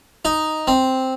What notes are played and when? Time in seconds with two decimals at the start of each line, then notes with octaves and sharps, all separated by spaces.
0.25 D#4
0.67 C4